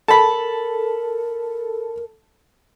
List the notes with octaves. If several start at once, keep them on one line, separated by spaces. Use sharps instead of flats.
A4 A#4 A5 B5